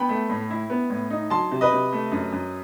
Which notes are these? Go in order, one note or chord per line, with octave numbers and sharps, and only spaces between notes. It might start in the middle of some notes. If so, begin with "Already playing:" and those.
Already playing: B3 G5 B5
A3
A2
E4
B3
A2
D#4
F#3 A5 C6
C3
B4 D#5
C3
A3
F#2
F#2